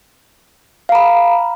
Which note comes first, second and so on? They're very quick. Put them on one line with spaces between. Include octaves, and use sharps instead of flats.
F5 A#5 B5